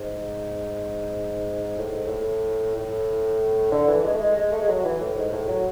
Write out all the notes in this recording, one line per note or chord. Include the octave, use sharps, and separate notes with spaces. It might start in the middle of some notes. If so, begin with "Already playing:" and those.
Already playing: G#2
A2
G#2
A2
A2
D3
E3
G#3
A3
G#3
G#3
A3
G#3
F#3
E3
A2
G#2
A2
F#3